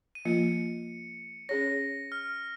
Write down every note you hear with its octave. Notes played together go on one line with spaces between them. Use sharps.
D#7
F3 A#3 F4 C#7
C#4 G#4 C#5 A#6
F6